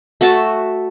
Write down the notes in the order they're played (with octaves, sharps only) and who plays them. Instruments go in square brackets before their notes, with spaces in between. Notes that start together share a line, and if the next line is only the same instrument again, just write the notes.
[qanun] A3 F#4 E5 A5